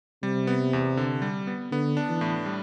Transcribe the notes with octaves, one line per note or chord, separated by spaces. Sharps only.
C3 G3
B3
E2
D3
G3
B3
D3 B3
D4
E3
A2
G3